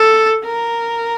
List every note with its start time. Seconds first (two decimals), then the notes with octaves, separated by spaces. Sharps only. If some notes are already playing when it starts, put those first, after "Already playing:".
Already playing: A4
0.44 A#4